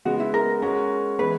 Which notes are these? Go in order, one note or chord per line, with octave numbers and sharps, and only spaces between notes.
C#3 G#3 B3 F#4
E4
A#4
G#3 C#4 F#4 A#4
E3 G#3 B3 B4